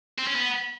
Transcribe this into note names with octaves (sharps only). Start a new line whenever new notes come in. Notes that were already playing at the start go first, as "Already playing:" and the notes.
C4
C#4
B3